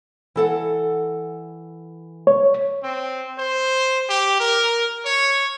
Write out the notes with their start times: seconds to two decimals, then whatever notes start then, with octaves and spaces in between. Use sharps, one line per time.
0.36 E3 A4 F#5
2.27 C#5
2.83 C4
3.39 C5
4.09 G4
4.40 A#4
5.05 C#5